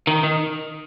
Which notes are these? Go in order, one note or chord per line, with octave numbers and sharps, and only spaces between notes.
D#3
D#3